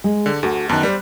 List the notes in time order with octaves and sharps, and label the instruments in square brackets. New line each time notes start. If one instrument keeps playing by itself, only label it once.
[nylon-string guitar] G#3
[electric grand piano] D3
[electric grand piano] D2 [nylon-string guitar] F#4 A4
[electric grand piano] F#2 A5 F#6 [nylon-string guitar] D#3 B3
[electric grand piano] G3 [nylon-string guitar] B4 C5